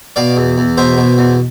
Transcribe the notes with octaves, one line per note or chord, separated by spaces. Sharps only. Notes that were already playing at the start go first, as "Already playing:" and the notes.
B2 D5 F5
E2
E2
B2 C5 E5
B2
E2